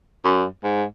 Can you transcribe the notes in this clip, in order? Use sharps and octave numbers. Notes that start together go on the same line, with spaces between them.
F#2
G#2